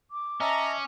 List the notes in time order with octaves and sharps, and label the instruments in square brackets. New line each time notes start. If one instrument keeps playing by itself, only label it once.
[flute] D6
[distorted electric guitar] C#4 [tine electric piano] D#5 E5 A5 [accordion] A#5